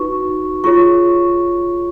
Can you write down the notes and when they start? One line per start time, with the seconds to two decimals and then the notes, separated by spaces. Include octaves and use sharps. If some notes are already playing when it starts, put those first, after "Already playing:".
Already playing: D#4 F#4 B4 C#6
0.64 F4 G#4 C#5 C#6